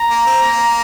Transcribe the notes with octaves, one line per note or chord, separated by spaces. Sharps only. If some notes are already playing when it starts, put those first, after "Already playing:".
Already playing: A#5
A#3
C4
A#3